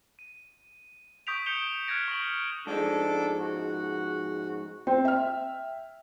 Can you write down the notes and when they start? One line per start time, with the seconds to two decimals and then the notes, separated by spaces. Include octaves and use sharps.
0.19 D#7
1.27 C#6 D#6 G6 B6 D7 F7
1.46 D#6 G6 C#7 E7 F7 G7
1.87 F6 F#6 G#6 A#6 D7
2.08 C#6 D7 F#7
2.67 G#2 F3 G#3 D4 A4 D6
3.39 F#4
4.87 C4 G5
5.05 E5 F6